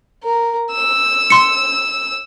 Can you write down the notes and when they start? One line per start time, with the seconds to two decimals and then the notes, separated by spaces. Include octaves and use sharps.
0.24 A#4
0.72 E6
1.30 C6 C#7